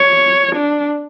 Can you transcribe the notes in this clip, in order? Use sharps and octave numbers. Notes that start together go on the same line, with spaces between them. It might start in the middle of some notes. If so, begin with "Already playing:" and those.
Already playing: C#5
D4